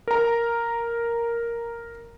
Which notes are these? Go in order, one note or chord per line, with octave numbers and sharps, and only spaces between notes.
A#4 A#5